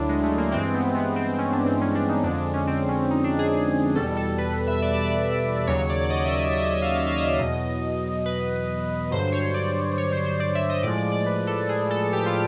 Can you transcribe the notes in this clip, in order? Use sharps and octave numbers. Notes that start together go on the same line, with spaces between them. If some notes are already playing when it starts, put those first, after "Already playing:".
Already playing: D2 D3 F#3 D4 E4
G#3
A3
A#3
G2 E3 G#3 C4
B3
B3
C4
C#4
D4
C4
C#4
D4
D#4
F2 D3 F3 G#3 D4
D4
C#4
C4
C#4
D#4
D4
G#4
E2 B2 G3 A4
A4
B4
E5
D5
D#2 C#3 F#3 C#5
D5
D#5
E5
E5
D#5
E5
F5
E5
D#5
E2 B2 F#3
B4
G2 D3 F#3 C5
C#5
D5
C#5
C5
C5
D5
E5
D#5
A2 F3 G#3 D5
D5
D5
B4
A4
G#4
A4
G4
F4